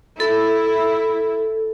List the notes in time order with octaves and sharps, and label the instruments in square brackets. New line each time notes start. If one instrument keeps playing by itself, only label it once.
[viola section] E4 [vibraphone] A4